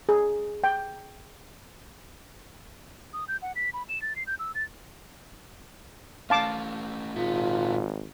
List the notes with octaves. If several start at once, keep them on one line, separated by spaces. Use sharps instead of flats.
G#4
G5
D#6
G6
F#5
B6
B5
E7
A6
C7
G6
E6
A6
A3 C#4 F5 A5 D6
G#1 A#2 F4 G#4 E5